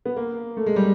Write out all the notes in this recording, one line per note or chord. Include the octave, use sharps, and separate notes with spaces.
B3
A#3
A3
G#3
G3